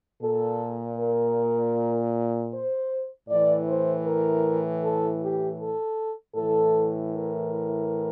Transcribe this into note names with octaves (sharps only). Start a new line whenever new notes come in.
A#2 A4
A#4
C5
A2 E3 D5
C5
A#4
A4
G4
A4
A2 E3 A4
A#4